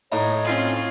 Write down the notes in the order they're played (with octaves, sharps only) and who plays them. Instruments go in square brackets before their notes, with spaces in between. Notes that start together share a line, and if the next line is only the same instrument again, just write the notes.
[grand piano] A2 D#4 A#5 [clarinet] C#5
[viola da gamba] C4 C#4 F4